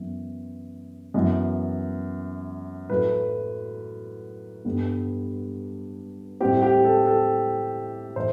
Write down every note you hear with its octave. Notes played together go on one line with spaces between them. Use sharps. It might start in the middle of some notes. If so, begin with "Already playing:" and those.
Already playing: F#2 E3 B3
F#2 E3 B3
A2 F#3 A3 B4
G2 D3 G3 B3
A2 G3 C4 G4
G4
A4
A4
A2 E3 C5